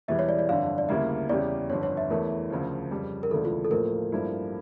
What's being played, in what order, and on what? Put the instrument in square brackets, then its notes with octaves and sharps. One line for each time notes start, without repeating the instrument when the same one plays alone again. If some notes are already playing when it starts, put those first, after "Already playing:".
[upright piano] E1 E2 E3 G3 [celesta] E5
[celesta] C#5
D5
D5
[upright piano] G1 F2 D3 [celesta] F5
[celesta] D5
[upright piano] D2 C#3 G3 A#3 E4 [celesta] E5
[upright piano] E2 C#3 G3 C#4 G4 [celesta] D5
[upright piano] G1 F2 D3 [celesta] C#5
[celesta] C#5
E5
[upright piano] E2 E3 A3 [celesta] A#4
[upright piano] D2 C#3 F3
F2 C#3 G3
[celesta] A#4
[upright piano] E1 D2 C#3 E3 [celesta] A4
[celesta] F4
A4
[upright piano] A1 A2 F3 A#3 [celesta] A#4
[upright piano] A1 G2 F3 A#3 E4